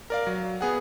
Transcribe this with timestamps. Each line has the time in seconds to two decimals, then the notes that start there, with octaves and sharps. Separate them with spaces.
0.10 A#4 D5 F5
0.27 F#3
0.61 B3 G#4 F#5